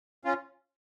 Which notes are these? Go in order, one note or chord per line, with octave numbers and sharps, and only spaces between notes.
C#4 F4